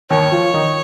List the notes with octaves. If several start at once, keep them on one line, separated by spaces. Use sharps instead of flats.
D#2 D#3 C#5
F3 F4
D#3 D#4